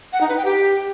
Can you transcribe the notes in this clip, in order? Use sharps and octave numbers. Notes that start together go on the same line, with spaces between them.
F#5
D#4
B4
G5
G4